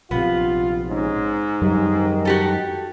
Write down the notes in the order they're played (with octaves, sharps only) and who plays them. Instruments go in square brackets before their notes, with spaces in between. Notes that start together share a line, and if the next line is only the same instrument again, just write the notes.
[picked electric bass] A#1 C3 [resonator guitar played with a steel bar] B3 [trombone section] F4
[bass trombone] G#2 [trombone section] G#3 C#4
[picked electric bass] F#2 F#3 G3 [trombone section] D#3
[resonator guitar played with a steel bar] F#4 G4 A4